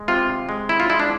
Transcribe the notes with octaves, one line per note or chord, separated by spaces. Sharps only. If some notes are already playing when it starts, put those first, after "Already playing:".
Already playing: G#3
C3 F4
G#3
E4
F4
G#3 E4
D4